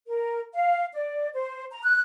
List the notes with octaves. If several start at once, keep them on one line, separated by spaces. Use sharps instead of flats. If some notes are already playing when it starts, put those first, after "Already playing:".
A#4
F5
D5
C5
A#5
F#6